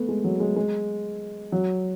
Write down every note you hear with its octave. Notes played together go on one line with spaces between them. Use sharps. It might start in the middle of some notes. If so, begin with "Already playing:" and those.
Already playing: A3 B3
G#3
F#3
G#3
G#3
F#3